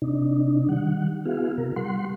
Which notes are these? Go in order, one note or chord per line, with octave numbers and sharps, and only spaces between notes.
C3 D4 D#4
D#3 G3 F#5
B3 E4 F#4 G#4 F5
C3 A#4
G3 F#5 C6